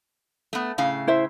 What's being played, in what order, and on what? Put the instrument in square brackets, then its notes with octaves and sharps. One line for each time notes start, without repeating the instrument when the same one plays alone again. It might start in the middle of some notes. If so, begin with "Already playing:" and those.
[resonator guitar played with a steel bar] A3 B3
A2 C#3 F5
[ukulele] E4 C5 E5